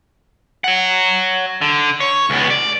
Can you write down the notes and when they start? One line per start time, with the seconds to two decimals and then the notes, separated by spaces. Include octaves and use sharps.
0.64 C#5 F#5
1.62 D3
2.00 C#5
2.30 C#2 B3
2.50 D5